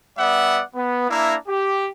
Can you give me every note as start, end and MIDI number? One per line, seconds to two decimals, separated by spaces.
0.18 0.62 55
0.18 0.62 59
0.18 0.62 74
0.18 0.62 76
0.18 0.62 78
0.75 1.09 59
1.09 1.36 58
1.09 1.36 62
1.09 1.36 64
1.09 1.36 76
1.09 1.36 82
1.48 1.88 67